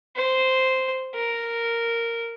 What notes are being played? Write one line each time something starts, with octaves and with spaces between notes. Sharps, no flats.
C5
A#4